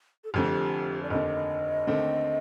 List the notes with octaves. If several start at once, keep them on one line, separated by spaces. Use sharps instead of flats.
A4
F1 F2 D3 G4
D5
F1 D#2 D3 D#5
D#2 D3 A3 C4